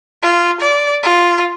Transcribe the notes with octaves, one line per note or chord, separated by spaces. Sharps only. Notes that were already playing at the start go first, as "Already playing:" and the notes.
F4
D5
F4